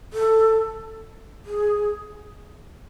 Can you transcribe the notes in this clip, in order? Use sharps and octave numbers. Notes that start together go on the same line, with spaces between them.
A4
G#4